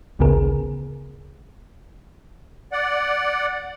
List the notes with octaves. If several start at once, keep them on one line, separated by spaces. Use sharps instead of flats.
A1 D2 C#3 B3 G#4 A#4
D5 F#5